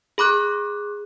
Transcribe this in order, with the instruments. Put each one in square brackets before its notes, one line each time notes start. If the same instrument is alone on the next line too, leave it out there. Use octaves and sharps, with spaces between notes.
[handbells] G#4 B5 D6 F#6